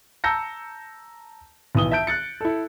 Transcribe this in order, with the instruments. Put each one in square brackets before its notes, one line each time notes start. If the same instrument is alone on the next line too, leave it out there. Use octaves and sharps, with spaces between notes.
[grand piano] A5 A#5 E6 G6 A#6 C#7
B1 E3 D#6 G7
E5 A5 G6 D7
F#6 A6 C#7
E4 A4